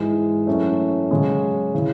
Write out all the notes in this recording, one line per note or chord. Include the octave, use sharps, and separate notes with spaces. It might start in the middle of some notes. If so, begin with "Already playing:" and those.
Already playing: G#2 E3 G#3
F#2 E3 A3 C#4
F#2 C#3 G#3 C#4
C#3 E3